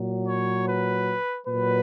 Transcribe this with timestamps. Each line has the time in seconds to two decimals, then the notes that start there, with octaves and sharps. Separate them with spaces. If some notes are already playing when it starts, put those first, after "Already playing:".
Already playing: A#2 F#3
0.26 C#5
0.65 B4
1.45 A#2 F#3 B4